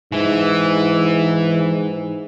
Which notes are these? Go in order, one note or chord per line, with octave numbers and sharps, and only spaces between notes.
G#2 E3